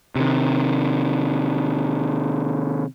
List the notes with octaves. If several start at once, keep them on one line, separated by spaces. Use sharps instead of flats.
C3 D#3